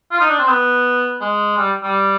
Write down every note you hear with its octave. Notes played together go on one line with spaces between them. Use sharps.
F4
D#4
D4
C4
B3
G#3
G3
G3